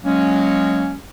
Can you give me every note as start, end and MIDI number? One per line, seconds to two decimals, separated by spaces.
0.04 0.95 54
0.04 0.95 56
0.04 0.95 58
0.04 0.95 61